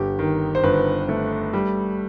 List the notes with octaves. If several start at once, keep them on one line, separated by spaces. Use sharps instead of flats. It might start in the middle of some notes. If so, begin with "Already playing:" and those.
Already playing: G1 G4
D#3
C5
G1 B4
A3
G3